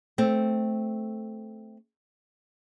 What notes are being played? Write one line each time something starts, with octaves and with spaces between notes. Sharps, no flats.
A3 C4